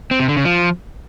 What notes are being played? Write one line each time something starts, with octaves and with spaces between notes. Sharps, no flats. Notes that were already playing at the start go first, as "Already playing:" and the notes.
C4
C3
D3
C#3
F3